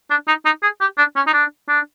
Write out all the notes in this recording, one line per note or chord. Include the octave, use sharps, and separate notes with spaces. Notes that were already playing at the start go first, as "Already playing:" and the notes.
D4
D#4
D#4
G#4
G4
D4
C#4
D#4
D4
D4